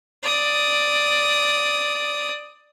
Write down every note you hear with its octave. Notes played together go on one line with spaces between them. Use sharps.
D5 D#6